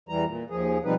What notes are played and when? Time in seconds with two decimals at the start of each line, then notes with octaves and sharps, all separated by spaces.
0.09 E2 E3 G3 A#5
0.25 A#2
0.50 D#2 F3 G#4
0.85 B2 F3 G3 C4 D#4 B4